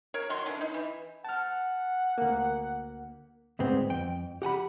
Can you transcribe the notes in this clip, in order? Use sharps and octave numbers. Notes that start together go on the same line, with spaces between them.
A#4 C#5
D#3 F#3 C#5 C6
D3 E3 C#4
D#4
E3
F#5 A5 F6
D2 A#3
D2 G#2 G#3 B3 C4
F2 G5
G4 F#5 G#5 B5